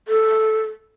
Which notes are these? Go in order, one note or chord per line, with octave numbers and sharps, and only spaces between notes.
A4